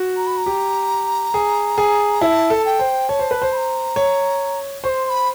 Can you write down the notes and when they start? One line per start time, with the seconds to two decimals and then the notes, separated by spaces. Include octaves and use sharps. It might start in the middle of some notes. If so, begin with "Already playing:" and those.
Already playing: F#4
0.17 A#5
0.27 B5
0.37 A#5
0.46 G4
1.34 G#4
1.78 G#4
2.21 E4 A5
2.50 A4
2.65 G5
2.79 C5
3.09 C#5 A5
3.19 C5
3.31 B4
3.42 C5
3.53 B5
3.57 A#5
3.96 C#5
4.84 C5 C#6
4.89 C6
5.05 C6
5.10 B5